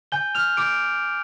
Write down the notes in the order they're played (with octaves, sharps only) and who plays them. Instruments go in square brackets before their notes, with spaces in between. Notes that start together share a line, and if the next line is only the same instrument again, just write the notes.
[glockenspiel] G#5 G6 G7
F6 F7
D6 G6 D7